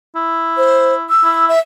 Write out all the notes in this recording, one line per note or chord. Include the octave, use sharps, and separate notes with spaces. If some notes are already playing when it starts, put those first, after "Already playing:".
E4
C5
E6
E4
E5